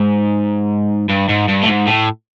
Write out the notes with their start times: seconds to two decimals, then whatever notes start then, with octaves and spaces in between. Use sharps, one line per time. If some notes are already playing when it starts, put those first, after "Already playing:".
Already playing: G#2
1.09 G2
1.29 G#2
1.49 G2
1.63 A2
1.68 G#2
1.87 A2